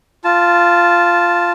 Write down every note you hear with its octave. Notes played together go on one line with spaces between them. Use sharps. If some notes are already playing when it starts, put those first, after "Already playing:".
F4 A5